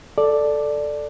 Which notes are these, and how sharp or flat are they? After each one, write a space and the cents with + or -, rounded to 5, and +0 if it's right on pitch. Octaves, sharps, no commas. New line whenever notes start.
A4 +0 D5 +5